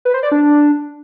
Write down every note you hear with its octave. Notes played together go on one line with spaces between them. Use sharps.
B4
C5
D5
D4